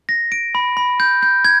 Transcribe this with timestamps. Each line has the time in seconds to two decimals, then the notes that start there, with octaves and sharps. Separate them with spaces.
0.09 A#6
0.32 D7
0.55 B5
0.77 B5
1.00 G6
1.23 G6
1.45 G#6